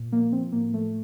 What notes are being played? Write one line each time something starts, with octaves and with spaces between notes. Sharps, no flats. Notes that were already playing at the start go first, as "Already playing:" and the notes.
Already playing: A#2
F3 A#3
F3 C4
A2 A#3
F3 A3